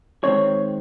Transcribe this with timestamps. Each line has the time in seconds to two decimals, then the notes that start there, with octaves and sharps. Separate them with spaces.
0.24 D#3 G#3 C4 C#5